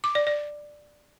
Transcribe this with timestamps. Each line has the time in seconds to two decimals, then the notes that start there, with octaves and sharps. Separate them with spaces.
0.04 D6
0.15 D5
0.27 D5